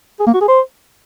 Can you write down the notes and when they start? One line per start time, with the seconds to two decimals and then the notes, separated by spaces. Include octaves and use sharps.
0.20 G#4
0.27 A#3
0.34 F#4
0.41 G#4
0.48 C5